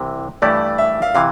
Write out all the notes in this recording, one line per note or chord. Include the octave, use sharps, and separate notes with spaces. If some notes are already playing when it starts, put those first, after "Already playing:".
Already playing: C2 C3 E3
G2 E3 A3 E4 G4 D5
E5
F5
C3 E3 F5